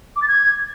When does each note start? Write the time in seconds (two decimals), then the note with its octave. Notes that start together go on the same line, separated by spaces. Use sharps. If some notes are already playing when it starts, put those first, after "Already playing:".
0.16 D6
0.22 A6
0.28 G#6